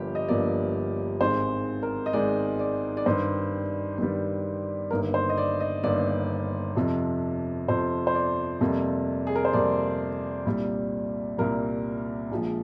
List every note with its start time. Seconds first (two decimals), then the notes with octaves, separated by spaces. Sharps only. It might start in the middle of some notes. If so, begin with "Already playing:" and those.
Already playing: G1 G2 F3 A#3 G4
0.15 D#5
0.28 G1 G2 F3 A#3 D5
1.21 G#1 G#2 D#3 G#3 C5
1.83 A#4
2.06 D#5
2.13 G#1 G#2 D#3 G#3 D5
2.59 D5
2.97 D5
3.06 G2 D#3 G3 C5
3.98 G2 D#3 G3
4.91 G1 G2 D#3 A#3 A#4
5.14 C5
5.29 D#5
5.37 D5
5.60 D#5
5.83 G1 G2 D#3 A#3 D5
6.76 F2 C3 F3
7.68 F2 C3 F3 C5
8.07 C5
8.15 D5
8.61 F2 C3 G3 A#3
9.27 G#4
9.36 A#4
9.45 C5
9.53 F2 C3 G3 A#3 D5
10.46 C2 A#2 G3
11.38 C2 A#2 G3 A#4
12.31 A#1 A#2 F3 G#3